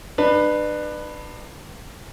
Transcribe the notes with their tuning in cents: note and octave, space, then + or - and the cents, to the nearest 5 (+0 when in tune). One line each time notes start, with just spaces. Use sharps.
D4 +35 B4 +0